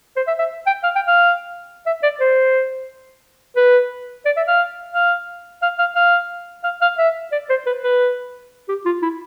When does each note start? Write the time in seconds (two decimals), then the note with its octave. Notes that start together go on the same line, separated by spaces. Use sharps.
0.16 C5
0.27 E5
0.38 E5
0.66 G5
0.83 F5
0.95 G5
1.07 F5
1.86 E5
2.03 D5
2.20 C5
3.56 B4
4.25 D5
4.36 E5
4.47 F5
4.93 F5
5.62 F5
5.78 F5
5.95 F5
6.63 F5
6.81 F5
6.98 E5
7.32 D5
7.49 C5
7.66 B4
7.84 B4
8.68 G4
8.85 F4
9.02 E4